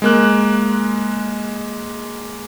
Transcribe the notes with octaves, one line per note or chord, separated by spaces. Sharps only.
G#3 A#3 F#6